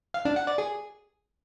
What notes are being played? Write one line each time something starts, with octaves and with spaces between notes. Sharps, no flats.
F5
D4
F#5
D5
G#4